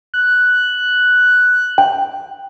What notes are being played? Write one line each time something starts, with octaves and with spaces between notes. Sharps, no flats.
F#6
G5